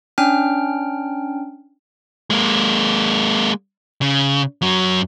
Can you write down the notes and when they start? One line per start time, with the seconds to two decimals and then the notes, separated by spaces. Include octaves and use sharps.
0.18 C#4 D4 G5 F6
2.30 G#3 A#3
4.02 C#3
4.62 F#2 F#3